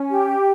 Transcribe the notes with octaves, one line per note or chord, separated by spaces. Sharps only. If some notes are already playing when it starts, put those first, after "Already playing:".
Already playing: C#4
G4